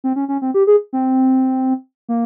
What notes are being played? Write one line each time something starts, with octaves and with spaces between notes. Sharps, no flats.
C4
C#4
C#4
C4
G4
G#4
C4
A#3